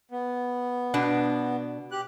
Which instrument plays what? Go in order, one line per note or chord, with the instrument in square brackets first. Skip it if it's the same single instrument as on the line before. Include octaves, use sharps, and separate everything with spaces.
[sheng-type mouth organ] B3
[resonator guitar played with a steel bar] B2 D4
[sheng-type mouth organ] G4 F#6